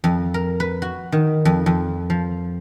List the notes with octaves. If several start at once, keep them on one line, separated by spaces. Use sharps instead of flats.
F2
A#4
B4
F#4
D#3
F2
F2
F3